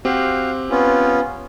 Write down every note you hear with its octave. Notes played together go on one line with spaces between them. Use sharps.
C4 F#4 G4 F5
B3 C#4 F4